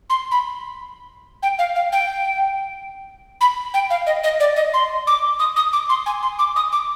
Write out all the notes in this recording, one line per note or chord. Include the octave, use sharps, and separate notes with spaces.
C6
B5
G5
F5
F5
G5
B5
G5
F5
D#5
D#5
D5
D#5
C6
D6
D#6
D#6
D6
C6
G#5
C6
D6
D#6
D6